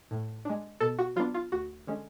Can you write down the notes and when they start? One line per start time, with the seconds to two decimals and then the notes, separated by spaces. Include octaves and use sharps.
0.11 A2
0.45 G#3 D4
0.81 B2 A4
0.99 F#4
1.16 F#3 B3 D4 F4
1.34 F4
1.52 D2 F#4
1.87 D3 G#3 C#4